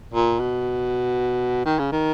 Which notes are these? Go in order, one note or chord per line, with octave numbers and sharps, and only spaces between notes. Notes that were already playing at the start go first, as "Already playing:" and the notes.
A#2
B2
D#3
C#3
D#3